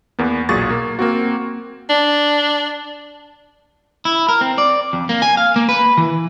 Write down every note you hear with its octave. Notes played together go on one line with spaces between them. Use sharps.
E2 A#3 B3
B1 A#2 F#3 G#4 C#6 A6
A#3
A#3 C4 F#4
D4
E4
A#4
C4
D5
F2
A#3
G#5
F5
A#3
B4
E3